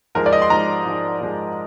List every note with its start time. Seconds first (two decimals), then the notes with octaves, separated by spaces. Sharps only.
0.15 G#2 F3 G#3 A#4
0.26 D5
0.33 D#5
0.42 C6
0.50 G#2 F3 G#3 A#5
0.85 G#2 F3 G#3
1.21 G#2 F3 G#3